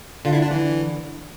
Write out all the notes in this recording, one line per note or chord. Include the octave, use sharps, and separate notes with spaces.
D3 F4
E4
D4
E3